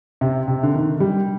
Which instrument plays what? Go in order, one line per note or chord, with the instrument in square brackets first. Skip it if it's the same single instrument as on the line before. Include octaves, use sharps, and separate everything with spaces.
[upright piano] C3
C3
D3
D#3
G3